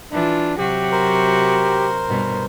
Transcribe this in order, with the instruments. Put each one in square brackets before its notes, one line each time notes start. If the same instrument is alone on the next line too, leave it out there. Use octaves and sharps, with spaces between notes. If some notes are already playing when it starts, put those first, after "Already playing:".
[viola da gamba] E3 F4 [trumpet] D4
[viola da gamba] C3 F#3 F#4 [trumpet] G4
[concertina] A#4 C5
[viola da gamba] G2 B2